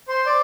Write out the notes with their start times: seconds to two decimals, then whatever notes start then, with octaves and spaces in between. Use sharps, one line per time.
0.08 C5 C6
0.26 D5 D6